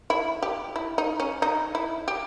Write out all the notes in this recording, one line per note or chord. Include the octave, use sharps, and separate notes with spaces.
E4
G4
E4
D#4
C#4
D#4
E4
G4